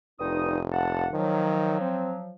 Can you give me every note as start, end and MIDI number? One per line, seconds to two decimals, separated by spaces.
0.20 1.07 29
0.20 0.58 43
0.20 0.58 63
0.20 0.58 87
0.72 1.07 58
0.72 1.07 78
0.72 1.07 81
1.13 1.81 51
1.13 2.35 53
1.13 2.35 54
1.81 2.14 60